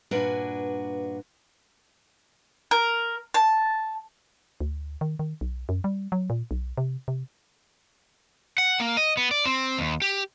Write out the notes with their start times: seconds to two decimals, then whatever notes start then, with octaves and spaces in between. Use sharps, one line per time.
0.11 G2 A#2 D4 F#4 B4 G#5
2.71 A#4
3.34 A5
4.60 D2
5.01 D#3
5.19 D#3
5.41 B1
5.69 F#2
5.84 G3
6.12 F#3
6.30 A#2
6.51 B1
6.78 C3
7.08 C3
8.58 F#5
8.80 A#3
8.97 D#5
9.17 B3
9.31 D5
9.46 C4
9.79 D#2
10.02 G4